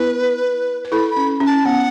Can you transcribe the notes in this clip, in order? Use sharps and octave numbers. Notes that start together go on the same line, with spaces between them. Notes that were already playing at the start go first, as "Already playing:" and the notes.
Already playing: B3 E4 B4
B4
E4 A4 B5
B5
C#4
C#4
A5
B3 F#5